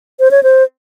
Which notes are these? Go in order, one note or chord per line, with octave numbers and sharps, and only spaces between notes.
C5
C#5
C5